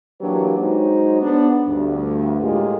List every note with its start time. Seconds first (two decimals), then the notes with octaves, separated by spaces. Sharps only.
0.21 E3 F#3 A#3 D4 G4 B4
0.58 F#3 G#3 D#4 F#4 C5 C#5
1.21 B3 D4 C5
1.67 D2 G2
2.41 A2 G#3 A#3 F4 G4